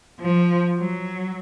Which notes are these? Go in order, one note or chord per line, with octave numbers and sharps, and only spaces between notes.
F3
F#3